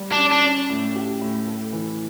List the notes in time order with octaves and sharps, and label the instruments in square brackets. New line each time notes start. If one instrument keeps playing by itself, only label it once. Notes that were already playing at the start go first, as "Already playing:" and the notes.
Already playing: [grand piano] G3
[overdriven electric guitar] D4
[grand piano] C#4
[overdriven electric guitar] D4
[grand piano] C#4
A2
G4
A2
A4
E3